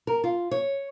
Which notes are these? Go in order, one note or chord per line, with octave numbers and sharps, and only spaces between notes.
A#4
F4
C#5